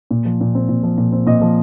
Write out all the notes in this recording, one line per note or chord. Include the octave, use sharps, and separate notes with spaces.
A#2
F3
A#2
C4
A#2
F3
A#2
C4
A#2 D#5
F3